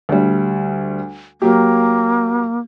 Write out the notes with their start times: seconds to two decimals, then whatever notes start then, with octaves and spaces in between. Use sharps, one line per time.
0.09 D2 G3
1.42 F#3 A#3 G4